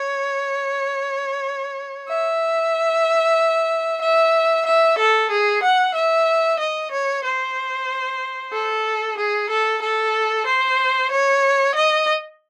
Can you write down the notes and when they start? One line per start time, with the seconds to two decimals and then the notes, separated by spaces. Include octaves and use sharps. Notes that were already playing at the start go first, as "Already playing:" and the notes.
Already playing: C#5
2.08 E5
4.02 E5
4.66 E5
4.99 A4
5.31 G#4
5.63 F#5
5.95 E5
6.60 D#5
6.92 C#5
7.24 C5
8.53 A4
9.18 G#4
9.50 A4
9.82 A4
10.47 C5
11.11 C#5
11.75 D#5